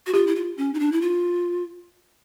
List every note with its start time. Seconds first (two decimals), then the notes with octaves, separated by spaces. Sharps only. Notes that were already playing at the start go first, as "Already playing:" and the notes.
0.06 F#4
0.14 F4 G4
0.27 E4
0.36 F4
0.57 C#4
0.74 D#4
0.80 D4
0.92 E4
1.01 F4